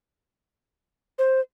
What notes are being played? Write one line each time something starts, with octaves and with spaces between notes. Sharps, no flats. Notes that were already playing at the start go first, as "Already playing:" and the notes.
C5